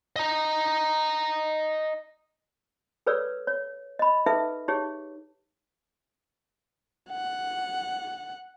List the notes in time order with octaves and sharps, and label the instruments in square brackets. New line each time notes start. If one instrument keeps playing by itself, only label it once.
[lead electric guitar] D#5 A#5
[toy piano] G#4 A4 B4 C#5 D5 E6
C#5
D#5 B5
D#4 G#4 A4 B4 E5
D#4 G4 G#4 C#5
[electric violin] F#5